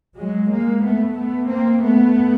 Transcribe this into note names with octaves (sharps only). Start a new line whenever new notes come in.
F#3 G#3
G#3 A#3
A3 B3
A3 B3
A#3 C4
A3 B3